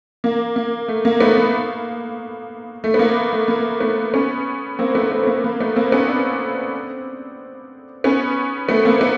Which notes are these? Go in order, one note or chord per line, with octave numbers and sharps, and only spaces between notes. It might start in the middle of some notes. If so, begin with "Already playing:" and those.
A#3
A#3
A3
A#3
A3 B3
A#3
A3
B3
A#3
A3
A#3
A3 B3
B3 C#4
A#3 C4
A3 B3
A3 B3
B3
A#3
A#3
A3 B3
A#3 C4
B3 C#4
C4 D4
B3 C#4
A3 B3
A#3 C4
B3